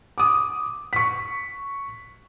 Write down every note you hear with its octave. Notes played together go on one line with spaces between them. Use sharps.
D6 D#6
C#6 B6